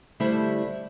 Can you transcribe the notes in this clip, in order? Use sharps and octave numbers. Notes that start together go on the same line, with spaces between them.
D3 G3 A3 E4 C5 E5